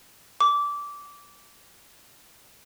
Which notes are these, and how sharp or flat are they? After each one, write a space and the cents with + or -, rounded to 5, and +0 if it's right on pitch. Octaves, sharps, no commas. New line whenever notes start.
D6 -20